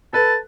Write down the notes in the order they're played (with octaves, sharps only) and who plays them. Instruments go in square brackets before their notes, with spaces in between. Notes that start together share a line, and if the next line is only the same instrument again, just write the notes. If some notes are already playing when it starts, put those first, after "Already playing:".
[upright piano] A4 B4 [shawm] A5